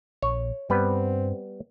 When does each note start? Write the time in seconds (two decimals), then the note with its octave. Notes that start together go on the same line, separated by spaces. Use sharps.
0.22 A#1 C#5
0.70 G2 G3 B3 C4 B4